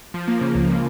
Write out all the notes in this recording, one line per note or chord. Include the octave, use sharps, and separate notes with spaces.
F3
A#3
C#3
C#2
C#3